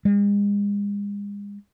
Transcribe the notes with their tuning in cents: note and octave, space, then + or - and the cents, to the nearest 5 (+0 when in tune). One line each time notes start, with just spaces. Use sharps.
G#3 -40